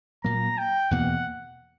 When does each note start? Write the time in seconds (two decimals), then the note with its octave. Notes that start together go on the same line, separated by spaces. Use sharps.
0.24 A#2 F#3 A#3 A#5
0.58 G5
0.91 E2 B2 A#3 F#5